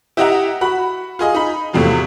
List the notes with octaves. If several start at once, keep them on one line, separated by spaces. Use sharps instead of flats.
E4 G4 D#5 E5 F#5 A#5
F#4 B5
F4 G#4 D#5
D#4 B5
E2 A2 C3 F3 F#3